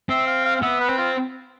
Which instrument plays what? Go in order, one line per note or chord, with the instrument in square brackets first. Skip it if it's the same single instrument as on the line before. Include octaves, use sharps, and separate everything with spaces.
[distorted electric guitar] C4 [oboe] E5
[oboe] F5
F5
F5
[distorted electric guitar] B3 [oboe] E5
[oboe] B4
[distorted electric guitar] C4
[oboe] F4